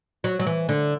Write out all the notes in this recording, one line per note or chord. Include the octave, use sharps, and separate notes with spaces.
F#3
F#3
E3
D3